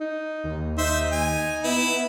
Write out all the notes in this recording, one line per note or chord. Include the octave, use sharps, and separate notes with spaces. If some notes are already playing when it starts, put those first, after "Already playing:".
D#4
D#2
D#4 C5 E5
G#5
B3 E4